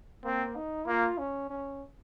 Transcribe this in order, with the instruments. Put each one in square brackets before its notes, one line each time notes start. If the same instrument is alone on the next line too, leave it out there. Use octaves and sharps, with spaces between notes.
[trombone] A#3 [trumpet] C4
[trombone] D#4
[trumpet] A#3 [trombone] F4
[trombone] C#4
C#4